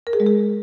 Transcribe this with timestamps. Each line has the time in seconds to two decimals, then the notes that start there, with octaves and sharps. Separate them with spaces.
0.07 A#4
0.13 G#4
0.20 G#3
0.26 G#4